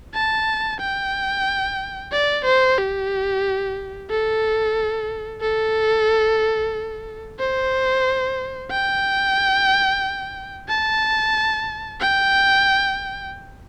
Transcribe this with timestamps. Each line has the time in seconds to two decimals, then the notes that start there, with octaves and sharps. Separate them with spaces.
0.14 A5
0.80 G5
2.12 D5
2.45 C5
2.78 G4
4.10 A4
5.41 A4
7.39 C5
8.71 G5
10.69 A5
12.01 G5